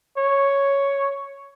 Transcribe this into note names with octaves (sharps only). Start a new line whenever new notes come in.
C#5